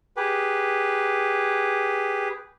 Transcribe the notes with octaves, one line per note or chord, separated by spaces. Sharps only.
G4 G#4 B4